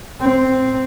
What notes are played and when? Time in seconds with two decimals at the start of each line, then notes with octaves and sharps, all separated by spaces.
0.21 C4